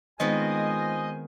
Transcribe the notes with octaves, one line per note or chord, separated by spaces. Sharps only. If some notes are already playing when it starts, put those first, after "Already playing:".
D#3 G#3 B3 C4 F4 C5 D#5 G#5